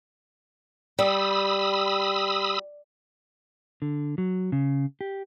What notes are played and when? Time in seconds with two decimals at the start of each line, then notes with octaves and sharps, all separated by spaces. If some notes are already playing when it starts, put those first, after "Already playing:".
0.99 G3 B5 D#6 E6
3.82 D3
4.18 F#3
4.52 C#3
5.01 G4